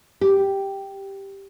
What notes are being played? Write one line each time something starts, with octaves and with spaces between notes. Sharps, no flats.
G4